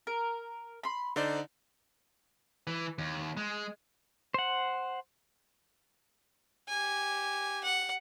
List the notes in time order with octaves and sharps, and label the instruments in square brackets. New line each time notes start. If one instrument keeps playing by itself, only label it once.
[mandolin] A#4
B5 C6
[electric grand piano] D3 D#4 D5 [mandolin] C5
[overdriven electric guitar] E3
D#2
G#3
[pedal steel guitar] C5 F#5
[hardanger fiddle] G4 G#5
F#5